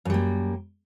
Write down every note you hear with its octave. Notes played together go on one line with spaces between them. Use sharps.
F#2 G3 A#3